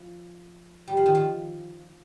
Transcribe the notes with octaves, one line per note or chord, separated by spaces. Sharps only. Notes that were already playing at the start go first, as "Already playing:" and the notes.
Already playing: F3
G3
F3
D#3
F3